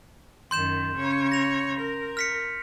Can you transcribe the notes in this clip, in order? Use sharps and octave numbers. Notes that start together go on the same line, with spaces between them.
F#2 D#3 C6 G6 E7
C#3 C#5
A#6 F7
A#4
F6 B6 C#7